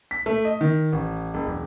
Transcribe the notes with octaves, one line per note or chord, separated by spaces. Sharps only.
B6
A3
D#5
D#3
A1
F#1
E1